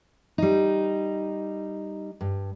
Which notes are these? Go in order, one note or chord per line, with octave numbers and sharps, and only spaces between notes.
G3 D#4
G2